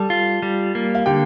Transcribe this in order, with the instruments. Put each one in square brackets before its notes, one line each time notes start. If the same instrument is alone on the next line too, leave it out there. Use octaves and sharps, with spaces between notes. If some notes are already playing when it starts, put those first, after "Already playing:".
Already playing: [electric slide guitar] G3 [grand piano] A4 A5
[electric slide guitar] F4
G3
A#3
[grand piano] F5
[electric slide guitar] D3 [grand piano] G4 G5